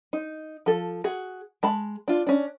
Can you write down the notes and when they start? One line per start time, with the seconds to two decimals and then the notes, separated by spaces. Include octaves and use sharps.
0.13 D#4
0.66 F3 A4
1.04 F#4 G#4
1.63 G#3 A5 B5
2.08 D4 F4
2.27 C#4 D4